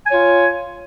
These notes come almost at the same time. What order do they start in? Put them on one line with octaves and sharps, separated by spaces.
G#5 C#5 F4